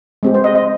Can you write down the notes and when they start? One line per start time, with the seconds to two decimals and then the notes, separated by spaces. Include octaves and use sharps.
0.23 G#3 C4 G4
0.34 C5
0.44 D#5
0.55 D#5